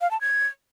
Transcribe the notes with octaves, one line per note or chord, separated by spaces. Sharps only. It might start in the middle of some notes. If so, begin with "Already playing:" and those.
F5
A5
G#6